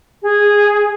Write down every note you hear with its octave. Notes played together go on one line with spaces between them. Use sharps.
G#4